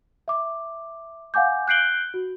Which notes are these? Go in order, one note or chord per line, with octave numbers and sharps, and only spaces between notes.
E5 D6
F5 F#5 G#5 D6 G6
F#6 G6 C7 D7 F#7 G7
F#4